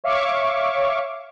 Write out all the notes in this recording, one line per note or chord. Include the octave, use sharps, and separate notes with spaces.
C#5 E5 F5 C#6 D6